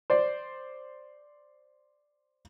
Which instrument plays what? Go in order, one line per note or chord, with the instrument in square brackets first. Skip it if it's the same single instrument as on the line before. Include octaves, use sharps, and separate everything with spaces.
[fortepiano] C5 D5